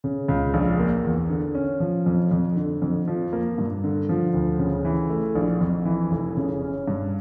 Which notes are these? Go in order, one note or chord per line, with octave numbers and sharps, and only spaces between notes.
C#3
C#2
A#1
A#3
E2
D3
C#4
F3
F2
F2
D3
F2
F3
A#3
G2
D3
F3
D2
C#3
E3
A3
A#1
F2
E3
F1
C#3
C#4
G2